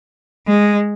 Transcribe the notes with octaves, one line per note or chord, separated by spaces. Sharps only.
G#3